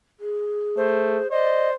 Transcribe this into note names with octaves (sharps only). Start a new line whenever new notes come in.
G#4
A3 C5
C5 D5 D#5